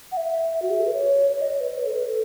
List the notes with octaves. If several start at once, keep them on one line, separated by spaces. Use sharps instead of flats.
F#5
E5
F#4
G#4
A4
B4
C#5
C#5
D#5
C#5
B4
C#5
B4
A4
B4
A4